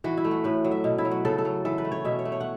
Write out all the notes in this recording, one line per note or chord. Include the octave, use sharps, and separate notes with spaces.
E3 F#4
E4
A3
F#4
A2 B4
F#3
E5
B2
E4
F#3
F#4
C#3 A4
A4
F#3
E3 A4
B4
A3
C#5
B2 E5
C#5
A3
C#5
F#5